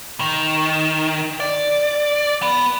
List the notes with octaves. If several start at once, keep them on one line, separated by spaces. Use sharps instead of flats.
D#3
D5
B3